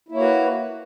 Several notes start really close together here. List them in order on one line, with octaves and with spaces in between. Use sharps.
E4 A#3 C#5 F#4 B4